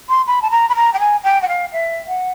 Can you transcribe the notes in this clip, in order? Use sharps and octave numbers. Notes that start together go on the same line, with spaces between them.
C6
B5
A5
A#5
B5
A#5
G5
G#5
G5
F#5
F5
E5
F#5